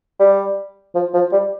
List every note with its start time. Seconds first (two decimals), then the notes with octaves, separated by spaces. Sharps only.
0.20 G3
0.95 F3
1.14 F3
1.32 G3